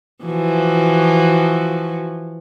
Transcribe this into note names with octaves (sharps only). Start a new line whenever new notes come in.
E3 F3 F#4